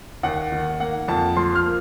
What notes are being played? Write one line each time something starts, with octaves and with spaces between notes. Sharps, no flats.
D#2 F#5
D#3
A#3 F#5
F2 A5
F3 C6
F6
A#3